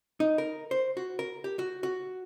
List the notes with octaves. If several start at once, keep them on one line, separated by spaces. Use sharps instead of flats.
D#4
A#4
C5
F#4
A#4
G4
F#4
F#4